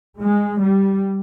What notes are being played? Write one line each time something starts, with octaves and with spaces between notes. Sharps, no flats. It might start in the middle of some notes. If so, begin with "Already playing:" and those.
G#3
G3